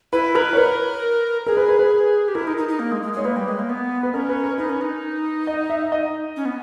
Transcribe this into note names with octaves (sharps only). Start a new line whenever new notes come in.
E4 B4
A#4 B4
C#5
A#4 B4
G#4 A#4
B4
B4
B4
G4
E4 A#4
D#4
D#4
D#4
A#3
G#3
G#3
G#3 C#5
A#3 B4
G3
G#3
A#3
B3
B4
C#4 A#4
B4
A#4
D#4 B4
C#4
D#4
D#5
E5
D#5
C#4
B3